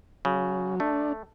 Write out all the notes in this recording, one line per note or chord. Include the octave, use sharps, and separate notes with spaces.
C#3 F#3
A3 D4